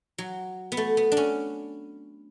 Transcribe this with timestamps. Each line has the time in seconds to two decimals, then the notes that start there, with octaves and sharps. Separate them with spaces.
0.18 F#3
0.72 B3
0.77 A3
0.97 B3
1.12 D4
1.17 C#4